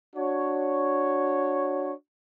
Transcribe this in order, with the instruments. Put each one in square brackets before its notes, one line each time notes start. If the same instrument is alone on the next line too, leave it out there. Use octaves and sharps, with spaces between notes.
[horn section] D4 F#4 C#5